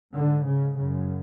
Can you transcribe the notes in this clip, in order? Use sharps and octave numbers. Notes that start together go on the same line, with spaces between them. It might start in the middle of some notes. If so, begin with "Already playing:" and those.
G#2 D3
C#3
F#2 C#3